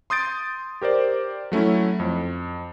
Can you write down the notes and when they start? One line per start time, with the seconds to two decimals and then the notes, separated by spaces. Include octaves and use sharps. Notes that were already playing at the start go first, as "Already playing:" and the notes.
0.10 C6 D#6 G6 A6 D7
0.82 G4 A#4 C5 D5
1.52 F#3 A3 C#4 E4
2.00 F2